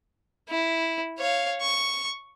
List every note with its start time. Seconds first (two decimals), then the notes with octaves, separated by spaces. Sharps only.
0.49 E4
1.18 C#5 F5
1.61 C#6